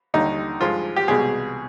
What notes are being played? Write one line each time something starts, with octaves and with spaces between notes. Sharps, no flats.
D#2 D3 G3 D#4
G2 F3 G#3 F4
G4
C2 B2 G#3 G#4